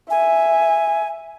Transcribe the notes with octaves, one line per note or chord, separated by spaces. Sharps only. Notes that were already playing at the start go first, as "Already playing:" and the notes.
E5 G#5